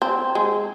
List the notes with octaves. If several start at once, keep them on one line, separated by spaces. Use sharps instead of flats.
C4
G#3